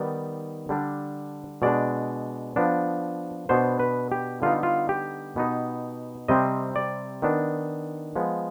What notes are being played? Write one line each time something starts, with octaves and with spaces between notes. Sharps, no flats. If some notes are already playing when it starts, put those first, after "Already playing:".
Already playing: D#3 G3 B3 D5
D3 G3 D4
B2 G#3 D4 D5
F3 B3 D4
B2 B3 D4 C5
B4
G4
D3 G3 B3 D#4 F4
F4
G4
B2 B3 D#4
C3 G3 C4 D#5
D5
D#3 B3 D4
F3 G#3 B3